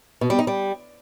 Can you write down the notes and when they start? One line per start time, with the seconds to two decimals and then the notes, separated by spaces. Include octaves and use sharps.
0.21 B2
0.30 G3
0.39 D#4
0.47 G3